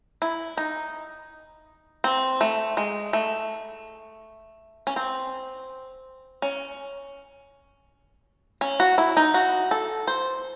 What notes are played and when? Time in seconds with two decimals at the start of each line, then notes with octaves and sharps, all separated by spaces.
0.22 E4
0.57 D#4
2.04 C4
2.41 A3
2.77 G#3
3.13 A3
4.87 C#4
4.96 C4
6.42 C#4
8.61 C#4
8.80 F#4
8.98 E4
9.17 D#4
9.34 F#4
9.71 A4
10.07 C5